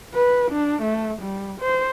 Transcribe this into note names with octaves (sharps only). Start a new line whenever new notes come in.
B4
D4
A3
G3
C5